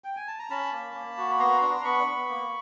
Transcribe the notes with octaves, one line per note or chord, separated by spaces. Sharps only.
G5
G#5
A5
A#5
C#4 A5 B5
A#3
A#3
F#4
B5
B3 A#5 C6
D4 A#5 C6
B3 B5 C#6
B3
A#3